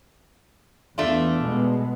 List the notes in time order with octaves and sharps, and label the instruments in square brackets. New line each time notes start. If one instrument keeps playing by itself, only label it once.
[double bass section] E2 [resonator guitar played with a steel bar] A3 D4 F4
[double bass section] B2 G#3 B3